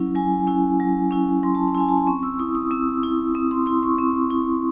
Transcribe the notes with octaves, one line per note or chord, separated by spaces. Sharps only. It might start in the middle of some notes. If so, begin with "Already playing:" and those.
Already playing: F#3 C#4 E4
F#3 G#5
C#4 E4
F#3
C#4 E4
F#3 C6
A5
C6
C#4 E4 G#5
A5
C6
C4 C#6
E6
E4 D#6
D#6
C4 E6
E4
C4 D#6
C6
E4 C6
C#6
C4
E4